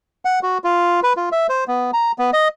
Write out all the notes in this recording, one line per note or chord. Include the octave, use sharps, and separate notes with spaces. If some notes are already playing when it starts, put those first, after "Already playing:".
F#5
F#4
F4
B4
F4
E5
C5
B3
A#5
B3
D#5